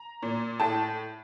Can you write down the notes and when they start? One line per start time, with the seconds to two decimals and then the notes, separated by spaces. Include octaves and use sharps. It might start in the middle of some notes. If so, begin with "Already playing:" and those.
Already playing: A#5
0.22 A#2
0.60 A2 A5